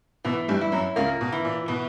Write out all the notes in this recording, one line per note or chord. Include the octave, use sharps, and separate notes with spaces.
B2 E3 B3
G2 G3
E4
F#2 F#3
C#2 C#3 A#3
B2
E3
A#2
B2 E3